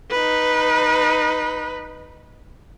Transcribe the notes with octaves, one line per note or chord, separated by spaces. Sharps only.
D#4 B4